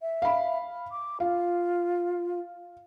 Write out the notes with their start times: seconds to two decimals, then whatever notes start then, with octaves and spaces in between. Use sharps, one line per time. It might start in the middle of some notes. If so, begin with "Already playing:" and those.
0.02 E5
0.22 F5 B5
0.91 D6
1.20 F4 F5